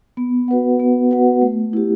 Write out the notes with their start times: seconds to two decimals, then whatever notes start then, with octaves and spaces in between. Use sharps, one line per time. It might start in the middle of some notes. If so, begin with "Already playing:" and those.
0.17 B3
0.48 F#4 B4 F#5
0.80 B3
1.11 F#4 B4 F#5
1.42 A3
1.73 E4 G4